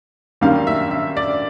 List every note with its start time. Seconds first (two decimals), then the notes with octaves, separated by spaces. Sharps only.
0.41 F#2 D#3 G3 A#3 F5
0.67 E5
0.91 E5
1.17 D5